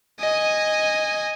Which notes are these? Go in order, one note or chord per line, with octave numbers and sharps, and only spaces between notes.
D#5 G#5